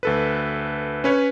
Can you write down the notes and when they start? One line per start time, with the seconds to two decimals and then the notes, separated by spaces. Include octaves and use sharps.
0.03 D2 A4 B4
1.04 C#4 B4 C#5